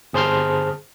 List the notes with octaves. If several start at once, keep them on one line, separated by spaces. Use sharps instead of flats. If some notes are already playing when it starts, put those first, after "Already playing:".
G1 G#4 C5 A5 C6 F6